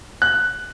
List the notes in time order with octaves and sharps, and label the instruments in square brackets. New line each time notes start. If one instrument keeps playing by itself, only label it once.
[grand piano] F#6